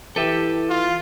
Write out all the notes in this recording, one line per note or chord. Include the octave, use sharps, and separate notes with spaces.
E3 G4 A4 B4 E5
F4